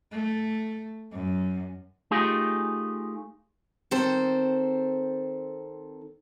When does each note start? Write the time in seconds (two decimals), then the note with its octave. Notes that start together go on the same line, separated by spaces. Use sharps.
0.11 A3
1.11 F#2
2.11 A3 D#4 F4 G4 G#4
3.91 D#3 C4 A4 C5